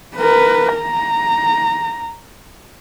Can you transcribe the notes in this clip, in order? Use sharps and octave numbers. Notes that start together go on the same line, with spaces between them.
A#4 B4
A#5